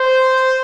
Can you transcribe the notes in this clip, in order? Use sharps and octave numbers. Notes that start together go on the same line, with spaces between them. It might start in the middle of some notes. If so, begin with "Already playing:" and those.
Already playing: C5